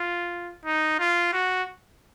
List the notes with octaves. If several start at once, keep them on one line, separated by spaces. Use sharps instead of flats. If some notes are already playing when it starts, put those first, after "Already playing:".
Already playing: F4
D#4
F4
F#4